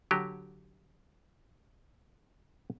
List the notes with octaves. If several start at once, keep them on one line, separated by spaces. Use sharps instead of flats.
D3 F#3 G4